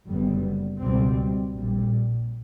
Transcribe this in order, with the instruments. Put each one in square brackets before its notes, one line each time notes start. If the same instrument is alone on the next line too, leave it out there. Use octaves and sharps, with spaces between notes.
[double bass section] F#1 F#2 D3 G3 B3
C#2 B2 G3 C4
A#1 A#2 G3